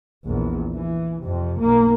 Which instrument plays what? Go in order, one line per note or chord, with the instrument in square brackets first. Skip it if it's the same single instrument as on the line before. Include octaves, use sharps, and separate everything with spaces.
[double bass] A#1 E2
E3
F2 C3
B1 A#3